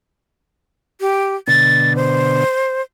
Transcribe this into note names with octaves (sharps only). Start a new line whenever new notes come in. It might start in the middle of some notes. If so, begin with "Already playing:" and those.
G4
B2 D3 A6
C5